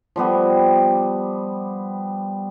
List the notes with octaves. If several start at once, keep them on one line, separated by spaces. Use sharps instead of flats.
F3 G3 B3 G4